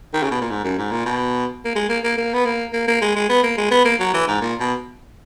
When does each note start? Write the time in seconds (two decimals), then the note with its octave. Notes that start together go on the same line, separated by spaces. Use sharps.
0.14 D#3
0.23 C#3
0.31 B2
0.41 A#2
0.51 G#2
0.64 F#2
0.78 G#2
0.91 A#2
1.06 B2
1.65 A#3
1.75 G#3
1.89 A#3
2.04 A#3
2.18 A#3
2.34 B3
2.46 A#3
2.73 A#3
2.88 A#3
3.02 G#3
3.16 G#3
3.29 B3
3.43 A#3
3.57 G#3
3.71 B3
3.85 A#3
4.00 F#3
4.14 E3
4.28 G#2
4.42 A#2
4.60 B2